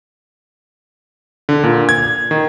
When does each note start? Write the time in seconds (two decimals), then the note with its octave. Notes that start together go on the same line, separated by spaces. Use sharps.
1.49 D3
1.63 A#2
1.89 G#6
2.31 D#3